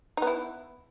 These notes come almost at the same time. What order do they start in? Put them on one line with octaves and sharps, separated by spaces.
D#4 B3 E4